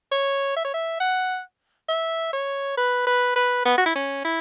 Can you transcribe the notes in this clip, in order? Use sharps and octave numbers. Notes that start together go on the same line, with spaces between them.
C#5
E5
C#5
E5
F#5
E5
C#5
B4
B4
B4
B3
F#4
E4
C#4
E4